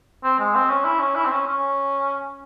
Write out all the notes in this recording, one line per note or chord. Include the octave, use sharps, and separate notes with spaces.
C4
G#3
C4
C#4
E4
C#4
E4
C4
C#4
C#4